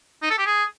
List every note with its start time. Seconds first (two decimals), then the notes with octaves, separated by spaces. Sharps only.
0.22 D#4
0.30 A4
0.38 G4
0.46 G#4